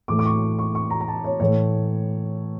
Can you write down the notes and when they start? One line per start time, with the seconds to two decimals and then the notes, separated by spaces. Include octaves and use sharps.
0.08 A2 E3 A3 D6
0.19 D6
0.26 C#6
0.59 C#6
0.75 C#6
0.90 A#5
1.01 A#5
1.08 A5
1.24 C#5
1.40 A2 E3 A3 C#5